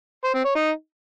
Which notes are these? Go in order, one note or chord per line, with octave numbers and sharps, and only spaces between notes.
C5
C4
C#5
D#4